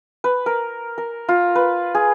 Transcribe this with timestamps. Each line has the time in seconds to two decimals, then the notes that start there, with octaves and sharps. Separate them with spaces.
0.24 B4
0.46 A#4
0.98 A#4
1.29 F4
1.55 B4
1.95 G#4